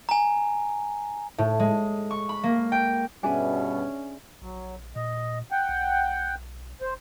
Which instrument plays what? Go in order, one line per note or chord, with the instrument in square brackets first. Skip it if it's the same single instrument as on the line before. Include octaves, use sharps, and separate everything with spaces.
[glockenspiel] G#5 A#5
[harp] A2
G#3
C#6
B5
A#3
G5
[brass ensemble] G2 B2 [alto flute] C#4 [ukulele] D4 G#4 E5 [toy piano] G#5 A5
[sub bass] A#1 [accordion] F#3
[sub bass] A#2 [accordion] D#5
[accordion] F#5 G5
[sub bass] B1
[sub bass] F1 [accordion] C5